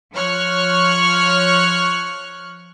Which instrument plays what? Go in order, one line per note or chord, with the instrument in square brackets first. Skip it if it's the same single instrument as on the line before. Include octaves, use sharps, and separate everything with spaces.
[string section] F3 C#5 C#6 F6 F#6